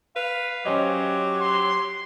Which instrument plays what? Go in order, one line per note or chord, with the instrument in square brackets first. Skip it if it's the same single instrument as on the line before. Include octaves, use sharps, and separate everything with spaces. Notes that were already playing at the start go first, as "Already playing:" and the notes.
[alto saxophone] B4 [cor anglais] F5
[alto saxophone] F#3 [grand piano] C#4 C5 D#5 [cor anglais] G4
[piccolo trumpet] C6